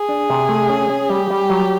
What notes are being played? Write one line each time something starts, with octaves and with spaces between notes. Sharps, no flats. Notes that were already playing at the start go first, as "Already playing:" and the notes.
Already playing: G#4
D4
C3
A3
C#4
C#4
G3 G4
G3
F#3